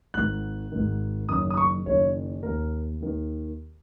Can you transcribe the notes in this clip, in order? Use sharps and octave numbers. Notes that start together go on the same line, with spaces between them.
G#1 G#2 D#3 F#6
G#1 G#2 D#3
F#1 F#2 D#3 D#6
D#6
C#6
F#1 F#2 D#3 C#5
D#2 D#3 A#4
D#2 D#3